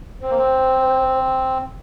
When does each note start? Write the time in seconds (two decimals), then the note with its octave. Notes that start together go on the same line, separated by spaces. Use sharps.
0.22 C4 C5
0.30 A#3
0.38 C4